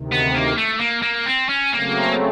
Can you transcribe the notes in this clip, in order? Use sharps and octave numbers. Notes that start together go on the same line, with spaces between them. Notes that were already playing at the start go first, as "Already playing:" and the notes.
Already playing: D2 C3 D#3
B3
A#3
A3
A#3
A#3
C4
C#4
C#3 F#3 A3 A#3 C4